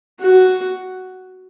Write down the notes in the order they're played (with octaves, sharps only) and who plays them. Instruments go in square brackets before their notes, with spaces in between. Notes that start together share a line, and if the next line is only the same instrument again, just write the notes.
[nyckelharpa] F#4